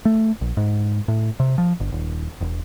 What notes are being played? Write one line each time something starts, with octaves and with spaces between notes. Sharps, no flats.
A3
A#1
G#2
A2
C3
F3
G1
D#1
E1